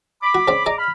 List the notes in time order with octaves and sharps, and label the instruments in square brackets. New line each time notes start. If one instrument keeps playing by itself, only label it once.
[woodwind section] B5 D6
[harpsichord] F#4
C#3 C4 D5
[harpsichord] G#4 D5 D#5 [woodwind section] A#5 D6
[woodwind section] B5 F6